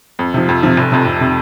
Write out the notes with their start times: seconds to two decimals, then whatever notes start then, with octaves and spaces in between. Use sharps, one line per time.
0.19 F2
0.34 C3 F3
0.49 F2
0.63 C3 F3
0.77 F1
0.92 F2 C3
1.05 F1
1.21 C3